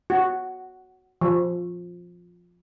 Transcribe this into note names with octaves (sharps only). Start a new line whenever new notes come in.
F#4
F3